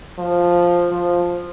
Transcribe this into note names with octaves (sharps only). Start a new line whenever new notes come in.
F3
F3